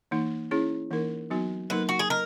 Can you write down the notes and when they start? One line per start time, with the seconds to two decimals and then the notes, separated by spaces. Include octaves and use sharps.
0.11 E3 A#3 D#4
0.51 C#4 E4 G#4 C#5
0.91 E3 A#3 D#4 A#4
1.30 F#3 B3 D#4 F#4
1.70 F#3 A#3 D#4 A#4 B4
1.89 F#4
1.99 G#4
2.10 A#4 D#5